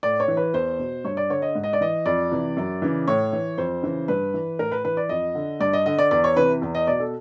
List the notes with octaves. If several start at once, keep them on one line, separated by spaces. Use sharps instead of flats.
A2 D5
C#5
E3
B4
E2 C5
B2
G2 C#5
D5
D3 C#5
D#5
G#2
D#5
D5
E3 D#5
F2 D5
C3 E3
F#2
C#3 E3
A2 C#5
E3
F2 C5
C#3 E3
G2 B4
E3
A2 A#4
B4
E3 B4
D5
F2 D#5
D3
G2 D5
D#5
D3 D#5
D5
E2 D5
C#5
C3 E3 B4
E2
D#5
B2 D5
A4